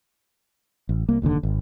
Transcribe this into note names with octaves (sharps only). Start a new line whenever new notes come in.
A1
C2 A#3
F1 D#2 A2 D3
G#1